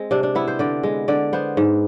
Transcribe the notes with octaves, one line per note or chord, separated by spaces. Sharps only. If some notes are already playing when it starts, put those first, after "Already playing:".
Already playing: G#3 C4
C3 D4
D4
B3 E4
C5
D3 D5
G#3
D3 D5
B3 C5
G#2